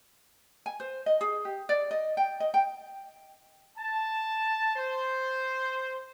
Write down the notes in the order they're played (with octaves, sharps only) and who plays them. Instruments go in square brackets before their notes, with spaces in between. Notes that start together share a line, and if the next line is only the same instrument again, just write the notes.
[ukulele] G#5
C5
D#5
G#4
G4
D5
D#5
G5
D#5
G5
[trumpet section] A5
C5